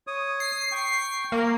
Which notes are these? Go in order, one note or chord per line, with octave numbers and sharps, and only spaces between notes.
C#5 D#6
C7
G5 C#6
A#3